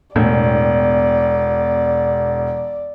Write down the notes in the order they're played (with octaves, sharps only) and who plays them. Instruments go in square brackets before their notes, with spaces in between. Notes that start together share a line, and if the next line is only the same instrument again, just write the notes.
[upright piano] E1 [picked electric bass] A2 [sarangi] D5